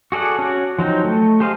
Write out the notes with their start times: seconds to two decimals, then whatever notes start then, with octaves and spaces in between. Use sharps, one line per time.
0.12 F#4 G#4 A4 D5 F#5
0.39 C#4 F#4
0.79 F3 F#3 D#4 G5
1.05 A3
1.40 G4 G#4 C5 D#5 F5